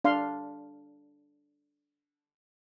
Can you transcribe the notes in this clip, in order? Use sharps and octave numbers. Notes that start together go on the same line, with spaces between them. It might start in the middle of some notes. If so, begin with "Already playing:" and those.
D4 F5 C6